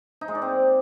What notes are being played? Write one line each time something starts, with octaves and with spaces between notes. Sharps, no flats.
D#4
G#3
D5
C4